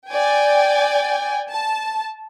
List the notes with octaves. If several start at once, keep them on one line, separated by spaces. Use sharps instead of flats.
D5 G5 G#5
A5